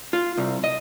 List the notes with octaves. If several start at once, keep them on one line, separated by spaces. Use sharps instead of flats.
F4
C2
D#5